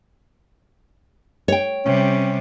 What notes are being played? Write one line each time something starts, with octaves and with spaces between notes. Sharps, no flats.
C#5 G5
C3 G3 C#4